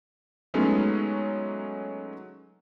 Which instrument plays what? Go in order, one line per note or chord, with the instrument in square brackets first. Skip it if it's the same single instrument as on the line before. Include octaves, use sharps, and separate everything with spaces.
[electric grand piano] F#3 G#3 A3 B3 C#4 D#4